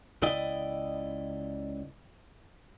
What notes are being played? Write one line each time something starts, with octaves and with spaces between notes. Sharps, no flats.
C#2 C#3 E4 D5 D#5 G5